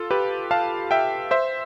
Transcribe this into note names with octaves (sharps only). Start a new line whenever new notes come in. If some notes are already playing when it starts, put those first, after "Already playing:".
Already playing: F4 A4
G4 B4
F5 A5
E5 G5
C5 E5